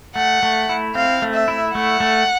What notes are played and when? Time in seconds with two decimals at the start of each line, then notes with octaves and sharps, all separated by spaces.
0.16 A3 F#5
0.43 A3
0.69 E4
0.95 C4 F5
1.22 A3
1.34 E5
1.48 E4
1.75 A3 F#5
2.00 A3